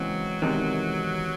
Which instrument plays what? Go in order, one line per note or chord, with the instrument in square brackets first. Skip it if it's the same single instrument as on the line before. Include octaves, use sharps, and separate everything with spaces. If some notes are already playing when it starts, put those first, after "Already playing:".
Already playing: [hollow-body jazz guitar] C#3 E3 G#3 C4 [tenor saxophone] F#3
[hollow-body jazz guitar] E2 C3 D#3 G#3